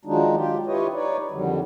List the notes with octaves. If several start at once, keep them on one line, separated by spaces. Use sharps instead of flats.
D#3 F3 F#3 G#3 D4 D#4
F4 G4
E4 F4 G4 B4 C#5 D#5
D#4 B4 C#5 D5
F2 D3 D#3 F#3 G3